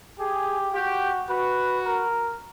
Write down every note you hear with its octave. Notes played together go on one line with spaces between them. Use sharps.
G4 G#4
F#4 G4
F#4 B4
A#4